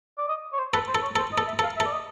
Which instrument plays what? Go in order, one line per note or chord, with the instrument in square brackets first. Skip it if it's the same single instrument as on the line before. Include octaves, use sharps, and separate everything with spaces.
[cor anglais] D5
D#5
C#5
C5
[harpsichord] A4 [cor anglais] B4
[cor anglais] C5
[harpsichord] A4
[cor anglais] C#5
[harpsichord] A4 [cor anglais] C5
[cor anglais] D#5
[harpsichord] A4
[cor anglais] E5
[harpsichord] A4 [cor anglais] F5
[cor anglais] E5
[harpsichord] A4
[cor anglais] D5
D#5